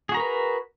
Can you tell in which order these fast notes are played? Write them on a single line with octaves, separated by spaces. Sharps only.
G#4 F#4 A#5 A#4 B4